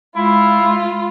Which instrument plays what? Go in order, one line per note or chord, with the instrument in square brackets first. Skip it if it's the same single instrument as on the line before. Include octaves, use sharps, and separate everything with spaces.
[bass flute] G#3 [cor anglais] E4 [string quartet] F4